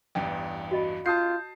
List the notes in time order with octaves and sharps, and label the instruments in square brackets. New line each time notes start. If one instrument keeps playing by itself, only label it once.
[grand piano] A1 E2 G2 [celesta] G5
[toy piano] F#4 D#5 B5
[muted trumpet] F4 [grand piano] A5 D#6 C7 [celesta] G6